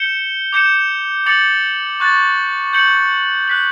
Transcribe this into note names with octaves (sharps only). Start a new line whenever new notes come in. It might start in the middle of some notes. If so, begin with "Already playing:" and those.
Already playing: G6 C#7 E7 G7
D6 G6 C#7 E7
D6 A6 C#7 F#7
C#6 F#6 A6
G6 C#7 F#7
F#6 B6 F#7